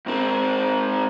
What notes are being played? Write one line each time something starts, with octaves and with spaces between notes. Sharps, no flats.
G#2 C4